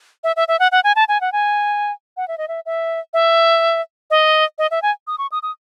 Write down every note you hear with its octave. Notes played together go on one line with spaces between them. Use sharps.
E5
E5
E5
F#5
F#5
G#5
A5
G#5
F#5
G#5
F#5
E5
D#5
E5
E5
E5
D#5
D#5
E5
G#5
D#6
C#6
D#6
D#6